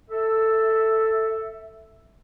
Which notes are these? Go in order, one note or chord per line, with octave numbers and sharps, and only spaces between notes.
A4 E5